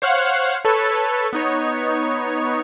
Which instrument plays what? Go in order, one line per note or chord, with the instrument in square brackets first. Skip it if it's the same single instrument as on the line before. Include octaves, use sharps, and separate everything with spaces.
[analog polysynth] C5 C#5 F5 F#5
A4 B4 C#5
B3 D#4 C#5